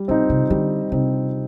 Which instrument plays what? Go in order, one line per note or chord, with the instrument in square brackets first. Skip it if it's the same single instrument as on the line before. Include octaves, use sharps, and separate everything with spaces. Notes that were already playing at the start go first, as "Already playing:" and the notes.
Already playing: [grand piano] G3
[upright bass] B2 [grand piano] C4 D#4
[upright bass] C3
[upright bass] D3 [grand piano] G3
[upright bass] C3 [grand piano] C4 D#4